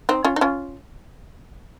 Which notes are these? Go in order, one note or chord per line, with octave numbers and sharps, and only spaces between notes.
C4 D#4
C#4 F4
D#4
C#4 F4